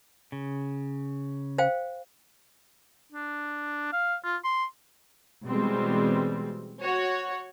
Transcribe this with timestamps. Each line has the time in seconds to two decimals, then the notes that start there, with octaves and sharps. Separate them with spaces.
0.32 C#3
1.58 C5 F5 G5
3.12 D4
3.93 F5
4.24 F4
4.44 C6
5.46 B2 E3 G3 G#3 C4
6.80 F#4 C#5